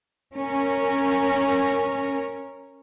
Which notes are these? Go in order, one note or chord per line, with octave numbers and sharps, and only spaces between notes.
C#4 A#4